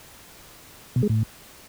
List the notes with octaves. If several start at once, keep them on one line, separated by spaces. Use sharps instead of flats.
B2
G#3
A2